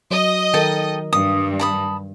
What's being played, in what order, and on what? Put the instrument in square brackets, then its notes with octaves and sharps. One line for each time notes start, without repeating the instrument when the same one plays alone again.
[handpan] F#3 [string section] D#5
[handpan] D#3 A#4 [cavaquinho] A4 G5
[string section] G2 [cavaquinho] D#6
[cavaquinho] A5 B5 D#6